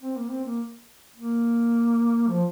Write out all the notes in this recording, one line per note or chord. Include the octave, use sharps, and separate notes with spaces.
C4
A#3
C4
A#3
A#3
F3